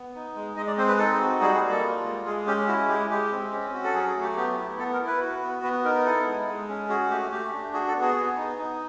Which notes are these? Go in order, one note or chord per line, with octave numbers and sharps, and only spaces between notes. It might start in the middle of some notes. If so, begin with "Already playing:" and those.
Already playing: B3
D#4
G#3
G#3 D#5
D5
C4 C5
B4
D#4 A4
F#4
G3 G#4
G#4
A#3
A4
F4
G#3
G#3 G#4
C#4 G4
E4 F#4
G#3 G4
G#3 G4
C4
C#4
F#4
A4
F#3 G#4
G#4
A3
G4
B3 G4
E4
B3 A4
A#4
E4
B4
F#4
B3
B3 B4
D#4 A#4
E4 A4
G#3
G#3
C#4
F#4 G#4
A3 G4
A3 G4
D4
F#4 G#4
A4
B3
G#4
B3
D#4
D#4